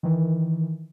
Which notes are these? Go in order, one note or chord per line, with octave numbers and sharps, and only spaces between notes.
D#3 E3